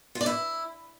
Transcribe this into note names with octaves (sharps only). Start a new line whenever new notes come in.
F4
D5
E4